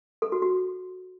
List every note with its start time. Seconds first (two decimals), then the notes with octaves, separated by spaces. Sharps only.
0.22 A4
0.32 F#4
0.42 F#4